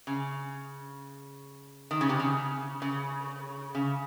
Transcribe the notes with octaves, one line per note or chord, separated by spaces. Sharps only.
C#3
D#3
C#3
C3
C#3
C#3
C#3